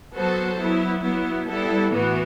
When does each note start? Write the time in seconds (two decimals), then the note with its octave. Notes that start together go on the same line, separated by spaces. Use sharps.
0.15 F#3 B3 F#4 A4 C5
0.59 F#3 B3 E4
1.03 F#3 B3 E4
1.47 G3 B3 E4 A4
1.91 A2 E3 B3 F#4